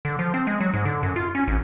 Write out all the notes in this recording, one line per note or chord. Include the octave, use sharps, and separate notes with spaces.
D3
F3
C4
G#3
F#3
G#2
D3
F#2
F4
C#4
G#1